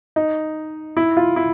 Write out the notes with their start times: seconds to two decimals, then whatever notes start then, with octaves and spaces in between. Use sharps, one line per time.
0.16 D#4
0.97 E4
1.17 F4
1.36 E4